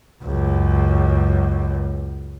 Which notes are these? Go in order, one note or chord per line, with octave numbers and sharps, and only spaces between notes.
C#2 F#2